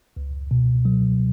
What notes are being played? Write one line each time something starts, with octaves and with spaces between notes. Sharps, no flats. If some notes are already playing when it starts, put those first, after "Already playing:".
C#2
B2
F#3